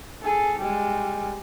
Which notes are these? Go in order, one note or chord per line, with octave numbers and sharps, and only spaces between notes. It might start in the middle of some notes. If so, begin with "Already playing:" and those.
G#4 A4
G3 G#3